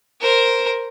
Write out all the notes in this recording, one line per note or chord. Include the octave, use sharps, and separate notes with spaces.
A#4 C5